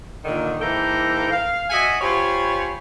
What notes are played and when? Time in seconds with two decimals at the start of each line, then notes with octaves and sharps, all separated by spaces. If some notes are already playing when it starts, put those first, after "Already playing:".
0.25 A#2 D3 D#3
0.61 G#2 E3 A#3 A4 G5 A#5
1.31 F5
1.70 F#4 D#5 E5 F#5 G#5
2.01 F4 G4 C5 C#5 G#5 B5